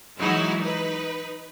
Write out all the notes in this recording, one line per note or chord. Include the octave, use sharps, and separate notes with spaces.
E3 F#3 G#3 D#4 E4 F#4
D#4 B4